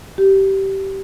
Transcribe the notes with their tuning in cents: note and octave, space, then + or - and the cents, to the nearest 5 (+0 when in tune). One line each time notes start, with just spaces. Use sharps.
G4 -20